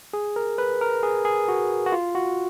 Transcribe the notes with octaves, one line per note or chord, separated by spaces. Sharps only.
G#4
A#4
B4
A#4
G#4
G#4
F#4
F#4
F4
F#4